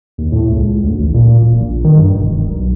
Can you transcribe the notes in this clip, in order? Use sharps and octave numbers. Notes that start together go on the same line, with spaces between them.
D#2
A2
C#2
D2
A1
A#2
D1
A#1
D#3
G2
E1
B1